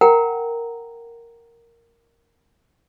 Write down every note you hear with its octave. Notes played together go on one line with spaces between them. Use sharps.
A#4 F#5 G5 A#5